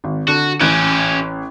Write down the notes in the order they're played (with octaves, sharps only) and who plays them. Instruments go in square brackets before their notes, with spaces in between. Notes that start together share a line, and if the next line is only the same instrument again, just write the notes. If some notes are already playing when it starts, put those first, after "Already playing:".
[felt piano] G#1
[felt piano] D3 [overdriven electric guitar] F#4
[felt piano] A1 F#6 G#6 [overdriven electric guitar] C#4 G4